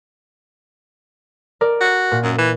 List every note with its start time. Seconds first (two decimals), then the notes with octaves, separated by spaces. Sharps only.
1.61 A#4 D5
1.81 F#4
2.12 A#2
2.24 F#2
2.38 E3